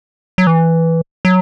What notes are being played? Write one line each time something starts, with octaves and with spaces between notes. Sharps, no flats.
F#3
E3
F#3